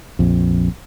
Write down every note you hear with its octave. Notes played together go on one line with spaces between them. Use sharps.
A#1 F2